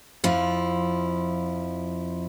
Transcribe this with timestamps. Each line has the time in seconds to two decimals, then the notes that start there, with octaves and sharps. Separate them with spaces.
0.24 F2 F3 E4